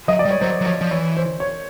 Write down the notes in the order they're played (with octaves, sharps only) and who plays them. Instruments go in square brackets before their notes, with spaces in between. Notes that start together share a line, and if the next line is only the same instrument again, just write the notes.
[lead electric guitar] F#3 [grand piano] D#5
[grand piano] D5
[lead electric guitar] G3
[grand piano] C#5
[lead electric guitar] F#3 [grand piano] C5
[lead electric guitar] F#3
[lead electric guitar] F3 [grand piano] C#5
[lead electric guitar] F3
[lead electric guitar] E3 [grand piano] C#5
[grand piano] C5
C#5